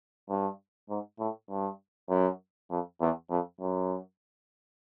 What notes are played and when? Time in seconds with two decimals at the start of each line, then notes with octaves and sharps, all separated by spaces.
0.29 G2
0.89 G#2
1.19 A2
1.50 G2
2.09 F#2
2.70 F2
3.00 E2
3.30 F2
3.60 F#2